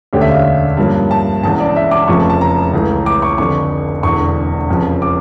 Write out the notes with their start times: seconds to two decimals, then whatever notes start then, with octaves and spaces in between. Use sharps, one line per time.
0.13 E1 D2 D3 A3 C#4 G4
0.21 E5
0.29 F5
0.77 G2 F3 A#3 C#4
1.11 A5
1.43 E1 E2 C#3 A5
1.60 D5
1.76 E5
1.91 D6
2.08 F1 F2 C#3 F3 A3 C#6
2.20 A5
2.30 A5
2.41 A#5
2.73 C#2 C#3 E3 A3
3.06 D6
3.22 C#6
3.38 F1 F2 D3 C#6
4.03 E1 E2 D3 C#6
4.69 F1 F2 C#3 F3
5.02 D6